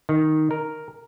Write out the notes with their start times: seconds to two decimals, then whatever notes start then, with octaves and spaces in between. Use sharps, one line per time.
0.09 D#3
0.51 A#4